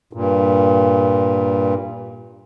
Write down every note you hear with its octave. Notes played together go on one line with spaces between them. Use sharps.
G2 A#2